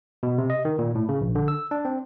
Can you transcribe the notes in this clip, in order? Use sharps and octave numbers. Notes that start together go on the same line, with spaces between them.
B2
C3
D#5
D#3
A#2
A2
C#3
A#1
D3
E6
D4
C4